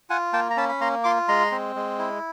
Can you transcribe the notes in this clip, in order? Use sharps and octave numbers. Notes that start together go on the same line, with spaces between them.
F4 F#5 G#5
A#3 G5 A5
A#5
C#4 A5 B5
B5
A#3 A#5 C6
F4 C6 D6
G#3 A#5 C6
C4
G#3
E4